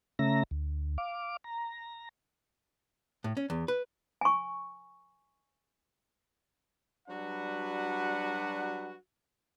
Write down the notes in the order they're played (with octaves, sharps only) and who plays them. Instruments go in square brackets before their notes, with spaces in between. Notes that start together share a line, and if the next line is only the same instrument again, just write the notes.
[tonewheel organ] C#3 A3 C#4 E5 A#5 A#6
D2
F5 D6
A#5
[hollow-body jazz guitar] A2
C#4
E2
B4
[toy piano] G#5 C#6
[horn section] F#3 G3 D4 F#4 B4 F#5